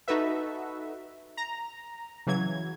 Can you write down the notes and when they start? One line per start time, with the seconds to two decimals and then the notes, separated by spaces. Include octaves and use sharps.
0.08 D#4 F#4 A4 B4 E5
1.37 A#5
2.27 C#3 E3 F#3 G#6